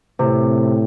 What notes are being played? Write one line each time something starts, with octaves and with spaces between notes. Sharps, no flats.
A2 C3